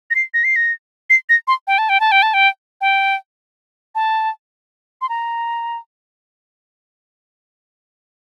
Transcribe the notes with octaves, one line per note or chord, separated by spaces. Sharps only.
A#6
C7
A#6
C7
A#6
C7
A#6
C6
G5
A5
G5
A5
G5
A5
G5
G5
A5
C6
A#5